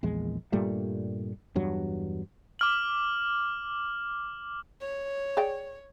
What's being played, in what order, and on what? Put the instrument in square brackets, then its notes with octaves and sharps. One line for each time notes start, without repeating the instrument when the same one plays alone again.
[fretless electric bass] A#1 E2 G#3
G2 A#2 G3 A3
E2 G2 F#3
[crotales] D6 F6 F#7
[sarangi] C#5
[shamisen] G#4 D5 G5